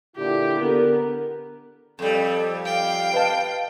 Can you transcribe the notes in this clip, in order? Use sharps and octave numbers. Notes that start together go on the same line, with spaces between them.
A#2 D3 E4 G4
D3 B3 A#4
F2 G3 A4
F5 G5
B4 D#5 A5